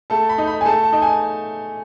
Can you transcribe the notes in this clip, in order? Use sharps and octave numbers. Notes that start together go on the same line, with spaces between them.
A3 A5
B5
D#4
B5
G#5
A3 A5
A5
D#4
G#5